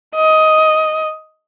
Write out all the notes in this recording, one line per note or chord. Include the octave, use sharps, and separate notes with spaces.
D#5